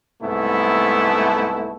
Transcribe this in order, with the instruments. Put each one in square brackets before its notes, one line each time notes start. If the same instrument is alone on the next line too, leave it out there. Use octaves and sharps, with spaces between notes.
[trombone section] C2 G#2 A3 B3 E4